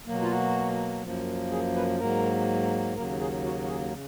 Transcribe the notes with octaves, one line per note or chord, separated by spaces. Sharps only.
B2 F#3 A#3
F4
F#4
F#2 F3 A#3
G#4
B4
G#2 F#3 A#3 A#4
D#2 C#3 F#3 A#3 A#4
G#4
F#4
F#4
G#4
C#3